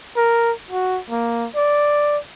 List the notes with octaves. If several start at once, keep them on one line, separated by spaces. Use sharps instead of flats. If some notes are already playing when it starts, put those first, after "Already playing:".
A#4
F#4
A#3
D5